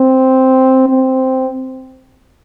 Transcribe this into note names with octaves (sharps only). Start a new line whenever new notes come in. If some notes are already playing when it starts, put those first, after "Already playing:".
Already playing: C4
C4